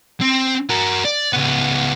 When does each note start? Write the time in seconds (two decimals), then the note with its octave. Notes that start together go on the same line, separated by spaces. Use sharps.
0.21 C4
0.70 F#4 A#4
1.05 D5
1.33 C#2 B3